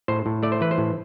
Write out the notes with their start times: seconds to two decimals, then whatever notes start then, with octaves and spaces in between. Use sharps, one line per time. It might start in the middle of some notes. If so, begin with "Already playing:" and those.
0.08 A2 C5
0.26 A2
0.43 A3 D5
0.52 C5
0.61 E3 B4
0.71 C5
0.78 A2